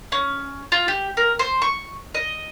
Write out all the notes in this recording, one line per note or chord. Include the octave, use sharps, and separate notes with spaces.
C#4
F4
G4
A#4
C5
C#6
D#5